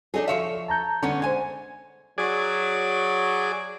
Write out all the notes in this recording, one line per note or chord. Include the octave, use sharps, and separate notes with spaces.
F#3 D4 D#4 G#4 A4
F3 C#5 E5 F5
A5 A#5 G6
D3 B3 C#4 C#5
G#3 C5 G#5 G#6
F#3 G#4 D5